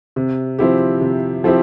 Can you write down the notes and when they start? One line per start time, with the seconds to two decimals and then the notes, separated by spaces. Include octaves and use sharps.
0.16 C3
0.59 F3 C4 E4 G4
1.01 C3
1.44 F3 C4 E4 G4